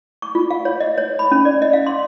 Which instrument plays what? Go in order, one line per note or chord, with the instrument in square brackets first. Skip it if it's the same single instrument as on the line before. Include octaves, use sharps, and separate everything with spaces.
[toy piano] C#6
F4
F5
C#5
D#5
C#5
B5
C#4
D5
D#5
F5
C6